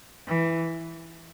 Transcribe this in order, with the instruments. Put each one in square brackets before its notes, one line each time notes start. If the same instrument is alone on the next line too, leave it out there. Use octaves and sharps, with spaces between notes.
[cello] E3